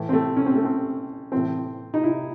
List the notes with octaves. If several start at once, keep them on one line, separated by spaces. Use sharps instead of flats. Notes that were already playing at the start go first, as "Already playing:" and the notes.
Already playing: A2 E3
C4
A3
C#4
C4
A3
C4
A2 E3 C4
D#4
E4